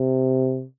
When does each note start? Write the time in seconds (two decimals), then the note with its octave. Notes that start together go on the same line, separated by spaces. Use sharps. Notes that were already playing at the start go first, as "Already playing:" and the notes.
Already playing: C3